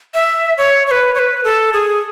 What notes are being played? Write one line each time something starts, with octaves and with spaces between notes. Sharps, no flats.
E5
C#5
C#5
B4
C#5
B4
A4
G#4